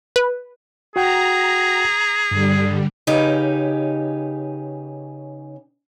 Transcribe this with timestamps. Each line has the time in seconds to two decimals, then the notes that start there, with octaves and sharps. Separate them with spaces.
0.16 B4
0.96 F#4 G#4 F#5 G5 A#5
2.31 G2 D3 G3
3.07 C#3 C#4 D#4 G4 B4